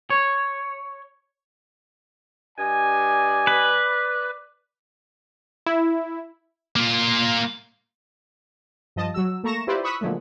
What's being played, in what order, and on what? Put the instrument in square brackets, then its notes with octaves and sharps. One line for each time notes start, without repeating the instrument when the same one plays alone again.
[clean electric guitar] C#5
[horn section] G2 D#5 G#5 [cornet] D5
[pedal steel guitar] B4
[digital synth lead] E4
[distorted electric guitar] A#3 F4
[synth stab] G2 F3 D#5 A5
F#3 F#4 E6
A3 A#3 A#5 C#6 A#6 E7
E4 F4 G4 B4 C5 D5
B5 C#6 D#6 E6 F#6 B6
A#2 D3 F3 F#3 G#3 A3